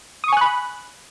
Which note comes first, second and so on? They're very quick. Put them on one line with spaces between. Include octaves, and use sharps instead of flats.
D#6 C#6 G#5 F#6 B5